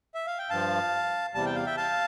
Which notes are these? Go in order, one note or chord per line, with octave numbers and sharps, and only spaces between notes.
E5
F5
G5
G2 F3 F5 A5
E2 C3 G3 A5
G5
F5
E5 G5
F5 A5